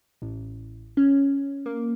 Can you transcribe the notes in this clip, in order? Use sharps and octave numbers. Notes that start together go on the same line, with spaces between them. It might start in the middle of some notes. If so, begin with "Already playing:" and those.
A1
C#4
A#3